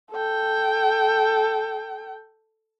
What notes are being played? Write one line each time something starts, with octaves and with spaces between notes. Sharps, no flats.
A4 G5